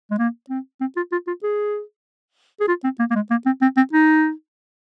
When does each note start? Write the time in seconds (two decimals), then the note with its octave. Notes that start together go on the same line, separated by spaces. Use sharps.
0.11 G#3
0.19 A#3
0.50 C4
0.81 C4
0.97 F4
1.12 F4
1.27 F4
1.43 G#4
2.61 G#4
2.68 F4
2.84 C4
2.99 A#3
3.11 A#3
3.15 G#3
3.31 A#3
3.46 C4
3.62 C4
3.77 C4
3.93 D#4